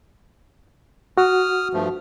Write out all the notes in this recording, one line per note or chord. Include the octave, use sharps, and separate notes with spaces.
F#4 D#6 F6
G2 F3 A3